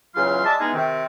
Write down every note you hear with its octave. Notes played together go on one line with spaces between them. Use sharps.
E2 C#3 F#3 F4 F5 C6
G#3 D5 E5 A5
E3 G#3 B3 D#4 F4 G#4
C3 D#3 C4